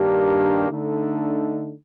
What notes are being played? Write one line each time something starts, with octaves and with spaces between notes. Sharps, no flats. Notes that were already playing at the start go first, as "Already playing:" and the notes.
Already playing: G2 D#3 A#3 D4 G4
D3 A3 D#4